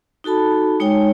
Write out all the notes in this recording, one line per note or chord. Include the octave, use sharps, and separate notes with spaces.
D#4 F#4 A4 A5 B5
G#3 D#4 C#5 G5